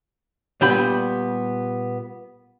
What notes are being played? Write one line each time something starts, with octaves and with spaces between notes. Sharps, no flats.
A#2 G3 B3 G5 B5